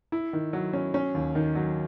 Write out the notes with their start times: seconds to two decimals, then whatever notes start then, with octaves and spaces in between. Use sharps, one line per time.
0.12 E4
0.33 D#3
0.53 F#3
0.73 C#4
0.94 C#4
1.15 D#2
1.35 D#3
1.55 F#3